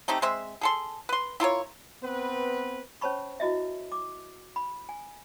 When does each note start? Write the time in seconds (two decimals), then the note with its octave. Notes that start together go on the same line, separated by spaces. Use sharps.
0.08 A3 C4 D#4 G4
0.22 G#3 C4 C5 E5
0.61 G#4 A4 C6
1.09 B4 C6
1.40 E4 F4 A#4 C#5
2.02 B3 C4 B4
3.01 C#4 C5 C#5 A5 B5 C#6
3.40 E4 F#4 D#5 E5
3.92 D6
4.56 B5
4.89 G#5